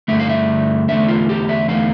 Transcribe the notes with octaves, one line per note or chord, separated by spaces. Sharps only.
G2 D3 A3 E5
F5
E5
E2 D3 A3 E5
F4
G4
E5
E2 D3 A3 F5